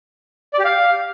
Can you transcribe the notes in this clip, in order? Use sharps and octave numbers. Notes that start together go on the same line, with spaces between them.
D5
G4
F5